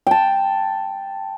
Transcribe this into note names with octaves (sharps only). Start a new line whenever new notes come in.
G5 A5